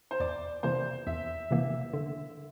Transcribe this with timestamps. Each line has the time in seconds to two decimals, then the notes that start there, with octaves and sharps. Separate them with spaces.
0.11 C5
0.20 E2 D5
0.63 C3 E3 A#3 C5
1.07 E2 E5
1.51 C3 E3 A#3
1.93 D3